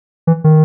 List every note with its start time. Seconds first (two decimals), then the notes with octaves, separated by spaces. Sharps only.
0.27 E3
0.44 D#3